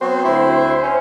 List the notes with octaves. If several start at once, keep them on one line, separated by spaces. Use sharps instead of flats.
F#3 B3 C4 F#4 C5
D2 E4 E5
C#4